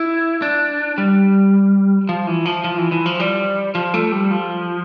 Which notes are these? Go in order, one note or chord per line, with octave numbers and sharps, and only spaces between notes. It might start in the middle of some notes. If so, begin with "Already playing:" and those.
Already playing: E4
D4
G3
F3
E3
F3
F3
E3
E3
F3
G3
F3
A3
G3
F3